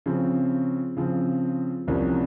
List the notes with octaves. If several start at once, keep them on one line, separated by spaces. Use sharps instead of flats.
C#3 F3 C4
C#3 F3 C4
C2 C3 F3 A#3 C#4